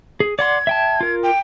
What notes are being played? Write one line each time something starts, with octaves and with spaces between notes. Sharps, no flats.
G#4
D5 F#5 C6 G#6
E5 G5 A5
F4 A#4
G5